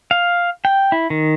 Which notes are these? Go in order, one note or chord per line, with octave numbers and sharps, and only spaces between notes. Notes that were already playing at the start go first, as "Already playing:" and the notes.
F5
G5
E4
D#3